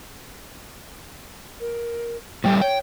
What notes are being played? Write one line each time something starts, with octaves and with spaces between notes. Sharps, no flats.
A#4
A2 G3 A3 G5
C#5 G5